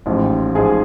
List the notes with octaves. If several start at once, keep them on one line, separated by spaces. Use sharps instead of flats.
A1 G#2 F3
G#2 F3 G#4